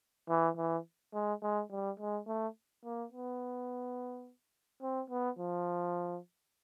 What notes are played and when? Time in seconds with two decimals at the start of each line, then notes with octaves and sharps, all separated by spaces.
0.29 E3
0.57 E3
1.14 G#3
1.43 G#3
1.71 G3
2.00 G#3
2.27 A3
2.85 A#3
3.12 B3
4.82 C4
5.10 B3
5.39 F3